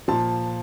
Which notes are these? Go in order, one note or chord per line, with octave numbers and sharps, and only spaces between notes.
A#2 F3 A5